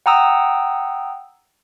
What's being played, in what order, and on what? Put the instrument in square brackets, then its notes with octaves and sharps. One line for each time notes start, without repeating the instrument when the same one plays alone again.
[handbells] F#5 G5 A#5 D#6 E6